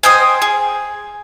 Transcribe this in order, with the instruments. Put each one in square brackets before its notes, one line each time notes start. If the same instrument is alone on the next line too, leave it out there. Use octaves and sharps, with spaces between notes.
[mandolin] C5 D#5 G5 G#5
G#4